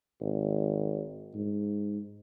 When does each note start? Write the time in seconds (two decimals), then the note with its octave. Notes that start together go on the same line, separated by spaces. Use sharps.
0.21 G#1
1.34 G#2